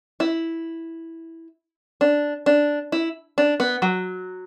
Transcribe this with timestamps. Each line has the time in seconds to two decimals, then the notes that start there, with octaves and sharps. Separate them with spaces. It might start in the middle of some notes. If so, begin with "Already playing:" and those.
0.20 E4
2.01 D4
2.46 D4
2.92 E4
3.38 D4
3.60 B3
3.82 F#3